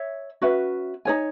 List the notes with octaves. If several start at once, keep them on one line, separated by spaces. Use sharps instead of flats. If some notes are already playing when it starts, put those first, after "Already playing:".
Already playing: C#5 E5
C#4 F#4 B4 E5
D#4 G#4 C#5 G#5